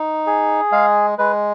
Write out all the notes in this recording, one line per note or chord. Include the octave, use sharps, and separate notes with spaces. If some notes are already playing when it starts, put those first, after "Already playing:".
Already playing: D#4
G#4
G#3 F5
G#3 B4